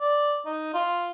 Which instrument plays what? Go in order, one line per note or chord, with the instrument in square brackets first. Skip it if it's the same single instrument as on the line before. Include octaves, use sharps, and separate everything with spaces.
[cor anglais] D5
D#4
F4